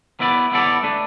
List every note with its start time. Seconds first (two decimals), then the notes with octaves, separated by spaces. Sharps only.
0.20 B3 E4 B4 D5
0.52 B3 E4 A4 D5
0.83 A3 D4 B4